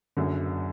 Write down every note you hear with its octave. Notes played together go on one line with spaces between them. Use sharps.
F#1 F#2 D3